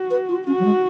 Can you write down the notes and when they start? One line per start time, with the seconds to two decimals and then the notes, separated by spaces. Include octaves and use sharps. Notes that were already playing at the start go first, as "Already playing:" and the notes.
Already playing: F#4
0.11 B4
0.29 F4
0.47 C#4 F#4
0.59 F#3
0.65 G#3